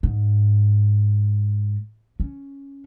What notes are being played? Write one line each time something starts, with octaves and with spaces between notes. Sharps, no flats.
G#2
C#4